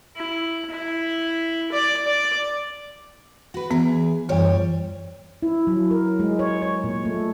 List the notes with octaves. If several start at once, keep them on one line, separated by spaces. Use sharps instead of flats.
E4
E4
D5
D5
F#4 B4
E3 B3 G#4
F#2 E3 G3 C5 C#5
E4
F#3
A#4
G#3
C#5
C#5
A#2
A3